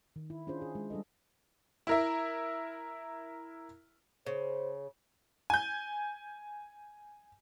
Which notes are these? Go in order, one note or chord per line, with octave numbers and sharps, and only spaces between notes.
D#3
E4
C#4 D4 F4 G#4 C5
G#4
G#3
G3 D4 A4 D#5
E4 A#4 E5
C#3 C5
G#5 G6